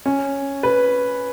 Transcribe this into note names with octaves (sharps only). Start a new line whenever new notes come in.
C#4
B4